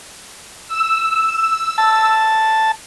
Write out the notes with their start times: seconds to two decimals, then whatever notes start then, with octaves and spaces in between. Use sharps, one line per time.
0.67 E6
1.78 A5